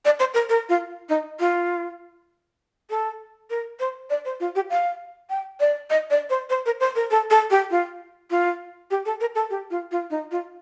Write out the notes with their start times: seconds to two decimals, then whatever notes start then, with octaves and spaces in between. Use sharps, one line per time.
0.05 D5
0.19 C5
0.34 A#4
0.49 A#4
0.69 F4
1.09 D#4
1.40 F4
2.90 A4
3.50 A#4
3.80 C5
4.10 D5
4.25 C5
4.40 F4
4.55 G4
4.70 F5
5.30 G5
5.60 D5
5.90 D#5
6.10 D5
6.30 C5
6.50 C5
6.66 A#4
6.80 C5
6.95 A#4
7.11 A4
7.30 A4
7.50 G4
7.71 F4
8.31 F4
8.91 G4
9.05 A4
9.21 A#4
9.35 A4
9.50 G4
9.71 F4
9.91 F4
10.10 D#4
10.31 F4